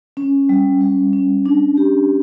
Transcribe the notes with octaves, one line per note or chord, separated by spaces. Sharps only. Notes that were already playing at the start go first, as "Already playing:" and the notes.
C#4
G3
G3
C#4
D4
G4